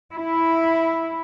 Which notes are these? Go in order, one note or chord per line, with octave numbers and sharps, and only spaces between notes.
E4